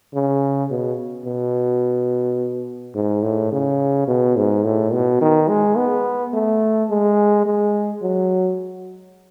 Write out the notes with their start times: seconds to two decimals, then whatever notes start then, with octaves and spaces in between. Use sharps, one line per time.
0.14 C#3
0.71 B2
1.26 B2
2.95 G#2
3.23 A2
3.52 C#3
4.08 B2
4.37 G#2
4.64 A2
4.93 B2
5.22 D#3
5.49 G#3
5.77 B3
6.34 A3
6.90 G#3
7.46 G#3
8.03 F#3